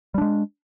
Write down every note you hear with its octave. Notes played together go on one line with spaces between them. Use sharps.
G3 G#3 D4